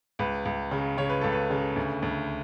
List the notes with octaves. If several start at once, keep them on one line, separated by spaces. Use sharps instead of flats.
C#2 B4
C#2
C#3
C#3 C#5
B4
C#2 A4
B4
C#3
D2
D2